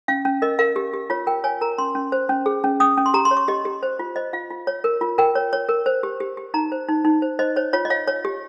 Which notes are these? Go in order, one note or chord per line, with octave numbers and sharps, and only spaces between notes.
C#4 F5
C#4
A#4 D#5
A#4 F5
G4
G4
F4 C#5
A#4 G5
C#5 G#5
A#4 A#5
C#4 C6
C#4
C5
C#4
G#4
C#4
C#4 D#6
C#4
C6
G4 A#5
C6
C#5
C#6
G4 D#5
G4
C5
F4
C5 D#5
F4 F5
F4
C#5
A#4
F4
A#4 G5
C#5
C#5
A#4
C5
G4
G4
G4
D#4 A#5
C5
D#4
D#4
C5
C5 D#5
C5 C#5
F4 C#5
D#5
C#5 F5
C#5
G4